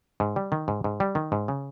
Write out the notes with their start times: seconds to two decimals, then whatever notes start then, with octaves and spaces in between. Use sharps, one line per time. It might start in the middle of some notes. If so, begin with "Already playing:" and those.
0.20 G#2
0.36 G3
0.52 D#3
0.68 G#2
0.84 G#2
1.00 G3
1.15 D#3
1.32 G#2
1.48 C#3